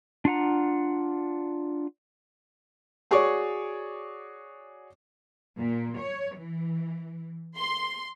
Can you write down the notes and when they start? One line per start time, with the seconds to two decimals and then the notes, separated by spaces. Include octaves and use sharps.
0.25 D4 F4 F#5 A#5
3.11 F#4 G#4 C#5 D5 C#6 D6
5.59 A#2
5.99 C#5
6.38 E3
7.58 C6